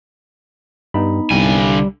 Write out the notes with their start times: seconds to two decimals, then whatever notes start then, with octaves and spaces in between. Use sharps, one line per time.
0.94 G2 B3 D#4 B5
1.31 C2 D3 G3 G#5